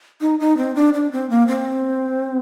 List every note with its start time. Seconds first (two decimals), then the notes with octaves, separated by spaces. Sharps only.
0.21 D#4
0.39 D#4
0.57 C4
0.76 D4
0.94 D4
1.12 C4
1.30 A#3
1.48 C4